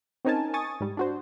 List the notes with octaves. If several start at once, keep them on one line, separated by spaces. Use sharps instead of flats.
C4 C#4 D#4 A#4 G#5 A5
G#5 C#6 D#6 A6
G#2 G3
D4 F#4 C5